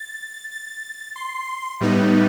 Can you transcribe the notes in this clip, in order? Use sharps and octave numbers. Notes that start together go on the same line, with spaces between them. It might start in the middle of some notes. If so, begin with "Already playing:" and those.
Already playing: A6
A6
C6
A2 G3 B3 D#4